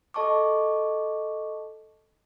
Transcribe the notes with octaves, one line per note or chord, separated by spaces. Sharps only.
A4 D#5 A5 C#6 D6